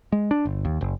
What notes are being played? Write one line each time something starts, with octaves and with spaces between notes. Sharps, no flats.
G#3
D4
G1
D#2
F#1